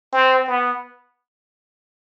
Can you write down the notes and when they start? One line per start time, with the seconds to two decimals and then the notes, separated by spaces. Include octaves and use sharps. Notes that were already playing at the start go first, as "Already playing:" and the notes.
0.13 C4
0.47 B3